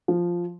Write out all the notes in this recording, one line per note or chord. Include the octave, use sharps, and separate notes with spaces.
F3